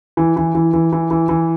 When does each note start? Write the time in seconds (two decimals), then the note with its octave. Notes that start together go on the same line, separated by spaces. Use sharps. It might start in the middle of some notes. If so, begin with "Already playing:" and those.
0.17 E3
0.36 E3
0.55 E3
0.74 E3
0.92 E3
1.11 E3
1.29 E3